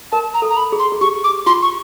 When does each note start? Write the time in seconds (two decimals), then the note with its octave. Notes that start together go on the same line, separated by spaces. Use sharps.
0.12 A#4 A5
0.34 A#5
0.42 A4
0.50 A#5
0.57 B5
0.72 G#4
0.79 C6
0.92 G#4
1.01 G4 C#6
1.24 D6
1.46 F4 C6
1.62 C#6